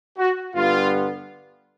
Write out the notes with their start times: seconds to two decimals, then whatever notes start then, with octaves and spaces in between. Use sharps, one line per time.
0.18 F#4
0.55 G2 D3 G3 B3 F4